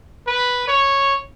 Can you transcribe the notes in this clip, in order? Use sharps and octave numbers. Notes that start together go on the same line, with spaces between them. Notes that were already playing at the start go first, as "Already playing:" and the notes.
B4
C#5